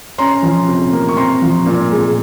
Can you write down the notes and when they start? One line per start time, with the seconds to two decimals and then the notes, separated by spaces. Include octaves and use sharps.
0.18 C#4 A#5 C6
0.43 F3
0.68 C3
0.92 A#3
1.09 C#6
1.17 C4 A#5 C6
1.42 F3
1.66 A#2
1.91 G#3